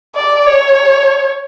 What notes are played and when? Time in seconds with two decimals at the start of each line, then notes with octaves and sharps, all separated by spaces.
0.16 D5
0.46 C#5